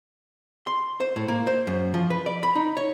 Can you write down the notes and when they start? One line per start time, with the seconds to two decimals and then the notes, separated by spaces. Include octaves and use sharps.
0.67 C6
1.00 C5
1.16 A2
1.28 A#3
1.47 C5
1.67 F#2
1.94 F3
2.10 B4
2.26 D5
2.43 B5
2.55 D#4
2.77 C#5